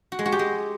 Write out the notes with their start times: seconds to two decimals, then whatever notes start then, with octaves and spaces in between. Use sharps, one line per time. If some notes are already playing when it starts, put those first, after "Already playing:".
0.12 F#4
0.19 G#3
0.26 F#4
0.32 G4
0.39 G#3